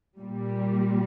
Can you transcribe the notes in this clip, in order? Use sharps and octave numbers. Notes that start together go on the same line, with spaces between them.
A#2 G3